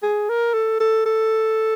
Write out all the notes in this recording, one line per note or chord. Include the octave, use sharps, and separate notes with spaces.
G#4
A#4
A4
A4
A4